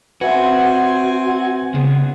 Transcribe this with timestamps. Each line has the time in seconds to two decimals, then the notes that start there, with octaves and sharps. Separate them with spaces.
0.21 C4 F#4 B4 E5 F#5 G#5
1.74 C#3 B3 G#4